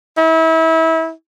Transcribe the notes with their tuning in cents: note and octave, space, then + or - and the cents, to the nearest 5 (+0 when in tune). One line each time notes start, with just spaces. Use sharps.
E4 -30